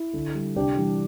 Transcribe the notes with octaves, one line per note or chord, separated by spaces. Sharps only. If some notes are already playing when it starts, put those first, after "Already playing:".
Already playing: E4
D3
G3
C3 D4 G4
E3 G3